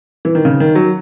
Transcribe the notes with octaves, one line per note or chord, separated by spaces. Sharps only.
E3
D#3
C#3
D#3
F#3